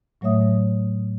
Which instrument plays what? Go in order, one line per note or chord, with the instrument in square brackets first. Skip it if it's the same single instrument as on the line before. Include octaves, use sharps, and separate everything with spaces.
[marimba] A2 F#3 A3 C#5 E5 D#6